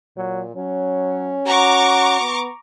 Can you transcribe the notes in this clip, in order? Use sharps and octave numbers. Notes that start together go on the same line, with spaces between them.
A#2 F#3
F#3 C#4
F#4 A#5 C#6 D6
B3